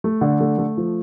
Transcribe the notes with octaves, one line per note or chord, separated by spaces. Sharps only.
A3
D3
A3
A3
F3